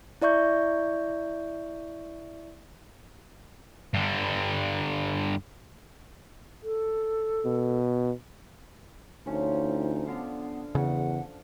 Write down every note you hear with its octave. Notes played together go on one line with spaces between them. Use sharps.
E4 D5 E5 C#6 G6
G2 D3
A4
B2
D2 F3 C#4 D#4
D3 B3 F5
E2 C#3 F#5